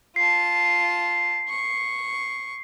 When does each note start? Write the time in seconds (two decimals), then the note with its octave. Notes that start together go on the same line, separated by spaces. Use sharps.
0.16 F4 A5 C7
1.49 C#6